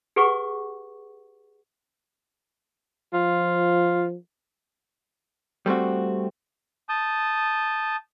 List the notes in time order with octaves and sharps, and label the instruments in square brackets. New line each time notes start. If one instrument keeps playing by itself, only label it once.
[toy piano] G4 G#4 B4 F#5 C#6 D6
[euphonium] F3 [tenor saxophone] F4
[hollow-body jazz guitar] G3 A3 C4 F#4
[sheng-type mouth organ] A5 D#6 G6